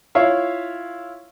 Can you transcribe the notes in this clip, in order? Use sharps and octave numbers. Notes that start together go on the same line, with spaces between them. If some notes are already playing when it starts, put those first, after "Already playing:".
E4 F4 C#5 E5 F5